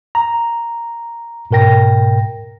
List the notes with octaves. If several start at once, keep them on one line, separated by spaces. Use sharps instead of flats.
A#5
G#2 B2 A#4 G5 A#6